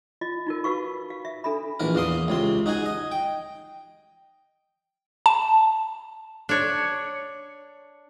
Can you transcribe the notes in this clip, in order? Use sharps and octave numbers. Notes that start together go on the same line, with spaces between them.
F4 D#5
D#4 F4 A#4
F#4 B4 F5 C#6
F5
E5
D4 A4 E5 B5
A#1 E3 A#4
E2 A#3 C6 D#6
C#2 C3 C6
D#4 F#4 G#4 G#5
D#5
G5
A5
D4 C#5